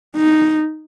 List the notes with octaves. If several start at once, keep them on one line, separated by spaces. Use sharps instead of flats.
D#4